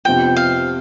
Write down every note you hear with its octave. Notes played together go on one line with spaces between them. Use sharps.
F2 C3 F3 B3 F4 G5
F5